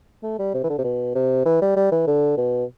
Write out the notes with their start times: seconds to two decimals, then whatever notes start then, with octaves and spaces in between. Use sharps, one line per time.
0.23 A3
0.39 G3
0.54 C3
0.64 E3
0.70 D3
0.78 C3
0.84 B2
1.15 C3
1.46 E3
1.62 G3
1.76 G3
1.92 E3
2.07 D3
2.37 B2